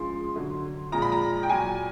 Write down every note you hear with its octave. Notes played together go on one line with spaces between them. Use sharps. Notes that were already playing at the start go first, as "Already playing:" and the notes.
Already playing: C#3 F3 G#3 C6
D3 F#3
A#2 F3 G#3 A#5
B5
A#5
G5
A#2 F#3 G#5